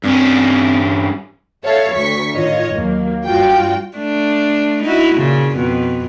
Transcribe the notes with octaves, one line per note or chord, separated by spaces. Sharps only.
G2 C4 C#4
A4 C#5 E5 F5
D2 C#6 B6
A2 D#3 F4 C#5 D#5
D#2 F#3 A#3
G2 F4 F#4 G5
A3 D4
D#4 E4 F#4
A#2 C#3
F2 B2